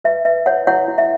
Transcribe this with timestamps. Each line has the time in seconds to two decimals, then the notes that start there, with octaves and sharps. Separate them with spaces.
0.04 B4 E5
0.25 B4 E5
0.46 E4 C#5 F#5
0.67 E4 C#5 F#5
0.88 E4
0.98 E5